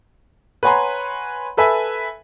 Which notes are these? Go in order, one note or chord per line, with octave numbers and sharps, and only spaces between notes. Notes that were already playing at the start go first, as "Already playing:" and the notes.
B4 C#5 F#5 G#5 A#5 C6
A4 B4 E5 G#5